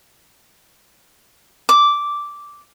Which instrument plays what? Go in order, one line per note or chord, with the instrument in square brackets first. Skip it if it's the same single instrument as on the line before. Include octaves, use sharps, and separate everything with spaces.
[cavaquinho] D6